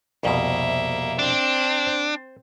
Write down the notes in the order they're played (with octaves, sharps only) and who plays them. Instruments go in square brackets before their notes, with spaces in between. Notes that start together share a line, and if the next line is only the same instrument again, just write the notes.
[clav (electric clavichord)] C2 F2 B2 [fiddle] A#3 E5
[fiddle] C4 [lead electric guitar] D4
[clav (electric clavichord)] C5